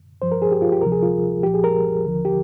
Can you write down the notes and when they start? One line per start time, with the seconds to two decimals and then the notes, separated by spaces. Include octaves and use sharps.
0.22 G2 F3 C5
0.32 A#4
0.42 G#4
0.52 G4
0.62 F4
0.72 G4
0.82 D2 C3 F3 A#4
0.92 G#4
1.03 F4
1.43 C2 A#2 F3 G4
1.54 G#4
1.64 A#4
2.05 D#2 D3 F3
2.25 G4